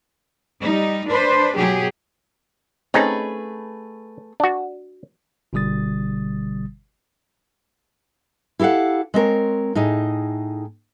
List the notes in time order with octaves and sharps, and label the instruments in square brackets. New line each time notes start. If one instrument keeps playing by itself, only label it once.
[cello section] G3 D#4
D4 B4 C5
B2 F#3 G4 G#4
[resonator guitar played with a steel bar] A3 G#4 B4 [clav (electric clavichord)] C4 C#4 D#4
[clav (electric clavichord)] D4 F#4
[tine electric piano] G1 B2 D3 G3 D#6 A6
[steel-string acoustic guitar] E4 G4 A4 F5 F#5
G#3 C4 A#4 C#5
A2 D#4 G#4